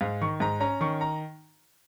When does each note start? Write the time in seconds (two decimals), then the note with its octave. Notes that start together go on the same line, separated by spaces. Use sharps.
0.01 G#2 F5
0.21 D#3 C#6
0.40 G#2 A#5
0.60 C#4 A#5
0.81 D#3 C#6
1.01 A#5